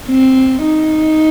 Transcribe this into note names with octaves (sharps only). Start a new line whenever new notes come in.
C4
D#4